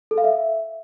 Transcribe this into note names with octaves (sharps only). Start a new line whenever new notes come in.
A4
F5
E5